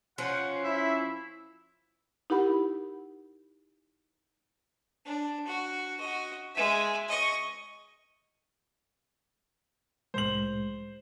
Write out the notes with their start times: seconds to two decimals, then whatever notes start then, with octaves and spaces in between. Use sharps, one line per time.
0.18 F3 C#4 C5 F#5
0.63 E4 E5
2.30 D#4 E4 G4 A#4 F#5 B5
5.05 D4
5.47 F#4
6.00 F#4 D#5
6.54 G#3 E5
7.09 D#5 C#6
10.14 C2 A2 G#3 C5 F#7